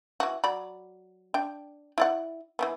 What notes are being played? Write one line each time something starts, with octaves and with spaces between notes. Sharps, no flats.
E3 F#4
F#3 D5 B5
D4 G5
E4 D5 F#5
E3 A#3 B3